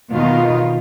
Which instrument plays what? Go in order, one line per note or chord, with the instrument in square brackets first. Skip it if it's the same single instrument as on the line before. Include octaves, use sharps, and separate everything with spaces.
[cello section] E2 B2 D#3 D#4 F4 F5